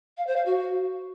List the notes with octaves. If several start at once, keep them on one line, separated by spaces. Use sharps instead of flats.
F5
C5
F5
F#4